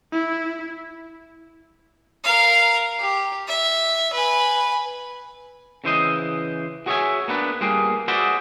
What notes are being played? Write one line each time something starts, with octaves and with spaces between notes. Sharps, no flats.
E4
A#4 F5
G4
E5
B4 G#5
C#3 E3 C5 D#5
F#4 G#4 C#5 D5 E5 G#5
A#3 B3 D4 B4
G3 A#3 F4 G#4
F#4 G#4 B4 C5 D5 E5